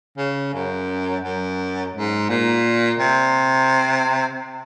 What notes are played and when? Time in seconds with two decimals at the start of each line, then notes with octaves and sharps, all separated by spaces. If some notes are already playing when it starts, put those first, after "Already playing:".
0.18 C#3
0.54 F#2
1.24 F#2
1.94 G#2
2.29 A#2
2.99 C3